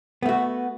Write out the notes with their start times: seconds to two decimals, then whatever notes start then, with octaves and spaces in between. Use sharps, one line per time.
0.23 B3
0.26 A3
0.29 F#4